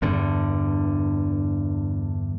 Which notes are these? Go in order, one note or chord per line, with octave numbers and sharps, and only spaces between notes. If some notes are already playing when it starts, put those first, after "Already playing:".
E2 G2 D3